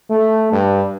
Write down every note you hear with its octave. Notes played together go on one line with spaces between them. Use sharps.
A3
G2